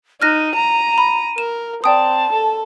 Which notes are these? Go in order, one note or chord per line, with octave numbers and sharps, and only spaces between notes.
D#4 F6 F#6 A#6 D#7
A#5
B5
A#4 E7
C4 D5 G5 A5 D#6
A4